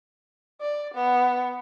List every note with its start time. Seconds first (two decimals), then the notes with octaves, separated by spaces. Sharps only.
0.61 D5
0.94 B3